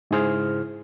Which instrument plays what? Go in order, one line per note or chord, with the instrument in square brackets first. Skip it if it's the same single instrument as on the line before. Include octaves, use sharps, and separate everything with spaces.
[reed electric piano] G#2 C#3 E4 G#4 C5 F6